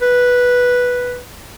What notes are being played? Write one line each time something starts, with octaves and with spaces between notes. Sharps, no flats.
B4